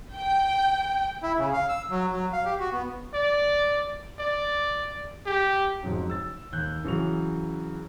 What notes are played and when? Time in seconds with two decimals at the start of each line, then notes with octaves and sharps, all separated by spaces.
0.16 G5
1.23 E4
1.38 C#3
1.53 F5
1.69 E6
1.90 F#3
2.11 F#3
2.33 F5
2.45 G4
2.60 F#4
2.73 B3
3.14 D5
4.19 D5
5.26 G4
5.83 F2 G#2 C#3 F#3
6.10 E6 A6
6.53 D#2 F#6 G6
6.84 C#3 E3 F#3 C#6 F7